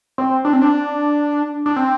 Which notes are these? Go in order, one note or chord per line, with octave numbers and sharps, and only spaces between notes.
C4
D4
C4
D4
D4
C4